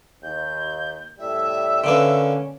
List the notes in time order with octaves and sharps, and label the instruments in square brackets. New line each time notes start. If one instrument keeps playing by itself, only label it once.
[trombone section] D#2 [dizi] G6
[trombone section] A2 C3 G3 [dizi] E5
[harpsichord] D3 A#3 B4 [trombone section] C#4